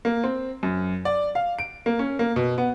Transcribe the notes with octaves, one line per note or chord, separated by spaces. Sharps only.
A#3
C4
F#2
D5
F5
D7
A#3
C#4
A#3
B2
B3